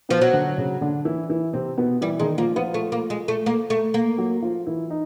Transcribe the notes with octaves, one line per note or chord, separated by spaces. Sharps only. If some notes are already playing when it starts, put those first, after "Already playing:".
B2 F3 B3
F#3
D3 D4
C#3 C#4
D3 D4
E3 E4
E3 E4
C3 C4
B2 B3
E3 G3 E4
D#3 G#3 D#4
F3 A#3 F4
F3 B3 F4
A3
A#3
G#3
A3
A#3
A3
A#3
F#3 F#4
F3 F4
E3 E4
D#4